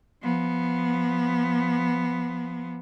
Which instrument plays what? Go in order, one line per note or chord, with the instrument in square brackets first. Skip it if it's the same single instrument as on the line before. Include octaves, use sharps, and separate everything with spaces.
[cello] F3 B3